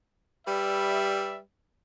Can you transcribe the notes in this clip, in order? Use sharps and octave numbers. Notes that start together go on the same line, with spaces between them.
G3 B4 D5 E5